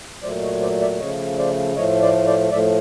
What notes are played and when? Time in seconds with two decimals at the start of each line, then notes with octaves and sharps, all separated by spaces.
0.23 A#2 F#3 A3 C5 D5
0.42 C#5 D#5
0.61 C5 D5
0.81 D5 E5
0.99 C#3 F3 A3 C#5 D#5
1.38 C5 D5
1.76 A2 F3 A3 C#5 D#5
2.02 C5 D5
2.27 C5 D5
2.52 A2 F3 A3 D5 E5